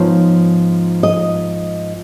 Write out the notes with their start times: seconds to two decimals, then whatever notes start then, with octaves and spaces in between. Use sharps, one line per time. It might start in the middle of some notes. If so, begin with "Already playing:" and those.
Already playing: G#2 F3 B3 C#5
1.03 D#5